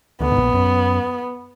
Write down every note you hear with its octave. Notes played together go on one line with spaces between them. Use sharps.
D2 D3 B3
G#2
A#1 A#2
F#2